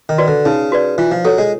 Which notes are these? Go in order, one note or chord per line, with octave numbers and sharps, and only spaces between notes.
D#3
F#4 B4 D5
D3
C#3 D#4
F#4 B4 D5
E3 F4
F3
F#3 A4 C#5
G#3